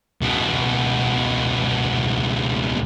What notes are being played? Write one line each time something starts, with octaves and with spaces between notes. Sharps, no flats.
C#2 B2